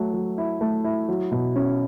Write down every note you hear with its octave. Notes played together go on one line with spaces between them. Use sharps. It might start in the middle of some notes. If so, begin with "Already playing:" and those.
Already playing: F#3 A3
F#3
E4
A3
E4
F#3
B2
C#4